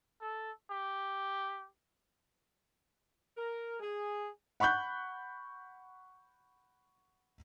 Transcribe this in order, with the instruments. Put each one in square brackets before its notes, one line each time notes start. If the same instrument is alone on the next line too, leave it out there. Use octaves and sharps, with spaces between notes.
[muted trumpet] A4
G4
[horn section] A#4
G#4
[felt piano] F#5 B5 C#6 F#6 G6